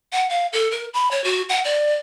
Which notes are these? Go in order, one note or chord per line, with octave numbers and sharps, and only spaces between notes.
F#5
F5
A4
A#4
B5
C#5
F#4
F#5
D5